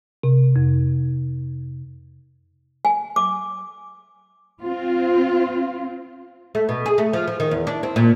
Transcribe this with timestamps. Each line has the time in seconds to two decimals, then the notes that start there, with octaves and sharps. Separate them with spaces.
0.23 C3
0.56 F2
2.85 G#5
3.16 D6
4.62 C4 F4
6.55 A3
6.69 B2
6.86 G#4
6.98 A3
7.13 F3
7.28 F3
7.40 D#3
7.51 E2
7.67 D4
7.83 C4
7.96 A#2